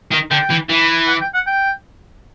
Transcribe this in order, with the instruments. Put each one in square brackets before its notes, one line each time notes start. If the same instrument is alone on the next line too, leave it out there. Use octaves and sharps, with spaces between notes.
[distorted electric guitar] D#3
[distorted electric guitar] D3 [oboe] G5
[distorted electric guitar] E3
E3
[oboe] F#5
G5
F#5
G5